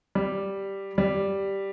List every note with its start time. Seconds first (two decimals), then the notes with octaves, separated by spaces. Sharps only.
0.15 G3
0.98 G3